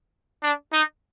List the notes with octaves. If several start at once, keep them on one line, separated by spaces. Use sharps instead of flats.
D4
D#4